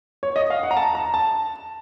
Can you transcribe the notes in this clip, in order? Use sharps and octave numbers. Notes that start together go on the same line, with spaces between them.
C#5
D#5
F5
F#5
A#5
A5
A#5
A5